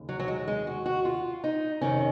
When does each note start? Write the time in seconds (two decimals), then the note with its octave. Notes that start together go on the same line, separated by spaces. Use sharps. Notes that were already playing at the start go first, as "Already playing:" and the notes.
Already playing: D#2 C#3
0.09 F#3
0.19 F#3
0.28 G#3
0.48 G#3
0.67 F#4
0.86 F#4
1.05 F4
1.44 D#4
1.81 F2 C3 D#3 C#4